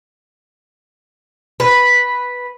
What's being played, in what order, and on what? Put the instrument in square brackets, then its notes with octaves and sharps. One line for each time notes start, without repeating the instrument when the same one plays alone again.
[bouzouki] B4